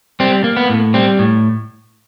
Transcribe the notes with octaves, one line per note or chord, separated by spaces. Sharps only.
G3 C4
A#3
B3
A2
G3 C4
A2